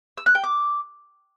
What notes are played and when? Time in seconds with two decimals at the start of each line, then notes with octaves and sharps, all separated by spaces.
0.17 E6
0.26 F#6
0.35 G5
0.44 D6